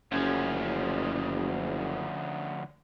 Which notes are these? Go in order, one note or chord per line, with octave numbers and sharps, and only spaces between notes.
F#1 D2 F3 C#4